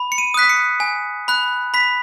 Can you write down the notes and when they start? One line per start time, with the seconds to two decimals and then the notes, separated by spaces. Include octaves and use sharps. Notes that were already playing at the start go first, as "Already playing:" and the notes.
Already playing: B5
0.12 C#7
0.18 D#7
0.34 D#6 F#6 B6
0.49 C#7
0.80 G#5
1.28 B5 F#6
1.74 B5 B6